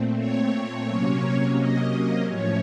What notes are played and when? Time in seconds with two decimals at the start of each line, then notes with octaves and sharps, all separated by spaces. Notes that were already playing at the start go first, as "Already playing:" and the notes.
Already playing: A#2 A3 C4
0.18 C#5
0.87 C3 F#3 A#3 C#4
1.57 D#5
2.27 A2 F3 A3 C#4 C#5